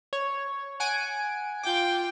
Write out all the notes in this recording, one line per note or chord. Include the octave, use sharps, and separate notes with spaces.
C#5
F#5 G#5 D7
F4 G5 D6 G6